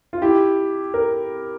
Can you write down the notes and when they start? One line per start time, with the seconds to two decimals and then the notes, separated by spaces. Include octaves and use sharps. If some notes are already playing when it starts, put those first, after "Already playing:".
0.13 F4
0.22 E4 G4
0.94 A#4